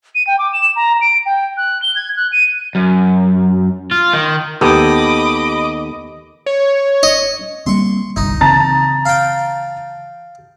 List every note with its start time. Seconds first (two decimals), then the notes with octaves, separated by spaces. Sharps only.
0.15 D#7
0.27 G5
0.39 D6
0.53 E7
0.76 A#5
1.01 D7
1.26 G5
1.57 F#6
1.82 G7
1.96 G#6
2.17 F#6
2.32 D#7
2.75 F#2
3.91 F4
4.14 D#3
4.61 D#2 B3 G4 A4 D#5 B5 D6 D#6
6.46 C#5
7.03 D#5
7.66 G3 A#3 C4 C6 C#6
8.16 G1 C2 D#4
8.41 C#3 E3 C4 A5 A#5 A6
9.05 F5 G5